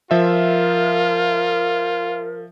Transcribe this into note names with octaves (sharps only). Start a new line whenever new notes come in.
F3 F4 A#4 E5